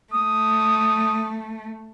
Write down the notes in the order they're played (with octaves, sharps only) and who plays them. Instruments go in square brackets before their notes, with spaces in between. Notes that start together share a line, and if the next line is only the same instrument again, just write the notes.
[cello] A3 [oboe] D#6